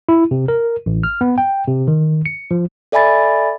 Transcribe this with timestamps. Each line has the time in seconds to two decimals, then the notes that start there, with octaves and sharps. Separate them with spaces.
0.09 E4
0.31 C3
0.48 A#4
0.86 A1
1.03 F6
1.21 B3
1.38 G5
1.67 C3
1.88 D#3
2.26 C#7
2.51 F3
2.92 A4 D5 E5 G#5 B5 A6